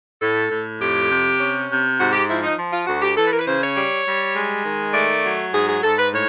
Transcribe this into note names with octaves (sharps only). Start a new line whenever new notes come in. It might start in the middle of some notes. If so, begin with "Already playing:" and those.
A2 A4
A2
F2 G4
C3
C#4
C3
G#2 F#4
G4
F3 E4
D#4
F3
F4
D2 F#4
G4
E3 A4
B4
A#4
B4
C#3 C5
C#5
G3
G3
G#3
D#3
A3 D5
F#3
G#2 G#4
G#4
G#2 A4
B4
A2 C#5